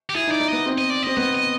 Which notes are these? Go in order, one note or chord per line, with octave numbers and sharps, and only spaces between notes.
G4
E4 G#4
D#4
D5
D#4
B3 D#5
C4
D#5
D5
C4 D#5
B3 D#5
D#5